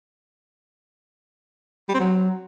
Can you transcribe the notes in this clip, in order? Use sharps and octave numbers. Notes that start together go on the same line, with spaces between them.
G3
C4
F#3